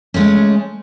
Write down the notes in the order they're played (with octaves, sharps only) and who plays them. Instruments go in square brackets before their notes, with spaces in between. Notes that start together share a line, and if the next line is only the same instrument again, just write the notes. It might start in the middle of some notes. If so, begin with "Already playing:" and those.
[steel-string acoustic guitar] G#3 A3 C#4